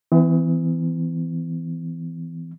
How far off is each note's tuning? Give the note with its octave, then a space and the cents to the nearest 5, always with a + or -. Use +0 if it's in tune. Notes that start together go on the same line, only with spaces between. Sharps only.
E3 +0 B3 +45